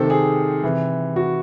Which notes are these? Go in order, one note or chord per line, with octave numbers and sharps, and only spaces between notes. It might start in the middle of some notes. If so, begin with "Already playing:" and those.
Already playing: C3 D#3 A4 C5
G#4
C3 E3
F#4